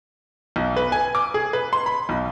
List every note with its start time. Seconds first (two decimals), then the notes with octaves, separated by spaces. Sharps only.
0.56 B1
0.76 B4
0.92 G#5
1.15 D6
1.34 G#4
1.53 B4
1.73 C6
1.86 B5
2.09 B1